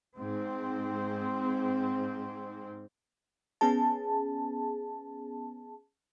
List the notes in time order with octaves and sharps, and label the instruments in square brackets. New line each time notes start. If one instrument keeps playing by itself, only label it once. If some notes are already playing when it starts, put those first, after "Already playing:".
[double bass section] G#2 C4
[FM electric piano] B3 C#4 G#4 A5